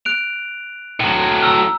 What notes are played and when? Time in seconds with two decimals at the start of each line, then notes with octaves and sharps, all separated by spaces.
0.05 F#6 D7 F7
1.00 A2 F#3
1.42 A#5 E6 F6